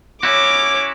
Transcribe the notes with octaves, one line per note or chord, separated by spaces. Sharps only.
C#4 E4 F#4 C#5 D6